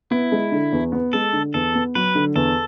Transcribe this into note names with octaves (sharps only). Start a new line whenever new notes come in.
B3 E4
G#3
D3
E2
B3
G#3 A4
D3
E2 A4
B3
F#3 B4
D3
E2 A4